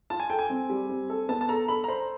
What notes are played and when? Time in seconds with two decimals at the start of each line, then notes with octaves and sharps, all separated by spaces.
0.10 F4 A5
0.20 G#5
0.30 A4 G5
0.39 G#5
0.50 C4
0.70 G3
0.89 C4
1.10 A4
1.29 B3 A5
1.41 A5
1.49 A4 A#5
1.68 A4 B5
1.84 A#5
1.88 C5 B5